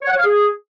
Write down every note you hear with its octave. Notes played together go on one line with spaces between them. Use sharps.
C#5
F#5
C#5
F5
G#4